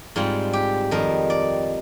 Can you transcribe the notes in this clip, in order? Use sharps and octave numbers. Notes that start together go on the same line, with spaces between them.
G#2 G3 C4 F4
G4
F2 D#3 G3 A#4
D5